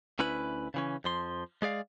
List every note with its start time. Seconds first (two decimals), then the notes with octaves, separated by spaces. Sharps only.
0.19 D2 C#4 E4 B4 B5
0.74 C#3 E3 C#4
1.04 F2 F3 C6
1.62 G#3 G#4 D5 F5